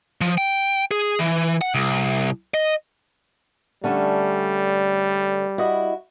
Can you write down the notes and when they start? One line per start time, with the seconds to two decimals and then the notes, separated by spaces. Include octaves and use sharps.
0.21 F3
0.38 G5
0.91 G#4
1.19 E3
1.61 F#5
1.74 C2
2.54 D#5
3.84 D3 G3 A3 C#4
5.58 E4 F#4 D#5